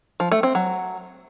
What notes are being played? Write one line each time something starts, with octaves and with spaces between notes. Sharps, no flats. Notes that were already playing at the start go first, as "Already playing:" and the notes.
F3
A3
C4
F#3